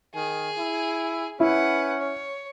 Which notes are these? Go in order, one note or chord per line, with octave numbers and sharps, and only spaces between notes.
D#3 G#4
E4
C#4 E4 B4 F#5
C#5